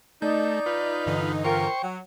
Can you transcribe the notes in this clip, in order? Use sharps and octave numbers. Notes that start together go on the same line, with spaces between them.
A3 D#4 D5 G6
F4 B4
G2 D3 E3
F4 A#4 C5 G5 C#6
F#3